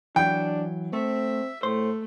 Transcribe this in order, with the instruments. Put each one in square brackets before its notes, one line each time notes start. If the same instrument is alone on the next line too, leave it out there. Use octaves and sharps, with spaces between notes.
[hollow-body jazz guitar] E3 F#3 [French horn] D4 [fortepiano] G5
[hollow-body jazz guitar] A3 [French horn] C4 [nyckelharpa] E5
[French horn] A2 [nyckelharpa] A3 [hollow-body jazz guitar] C5